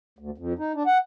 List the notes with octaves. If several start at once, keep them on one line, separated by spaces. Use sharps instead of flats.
D2
F2
D#4
D4
F#5